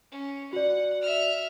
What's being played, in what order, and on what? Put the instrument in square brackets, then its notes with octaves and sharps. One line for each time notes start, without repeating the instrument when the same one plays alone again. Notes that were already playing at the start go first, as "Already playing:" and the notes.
[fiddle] C#4
[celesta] F#4 D5 [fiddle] F#5
[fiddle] E5 F6